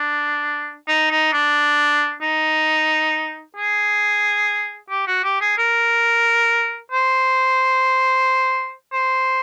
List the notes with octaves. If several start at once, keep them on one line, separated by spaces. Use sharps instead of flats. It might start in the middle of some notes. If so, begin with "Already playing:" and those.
Already playing: D4
D#4
D#4
D4
D#4
G#4
G4
F#4
G4
G#4
A#4
C5
C5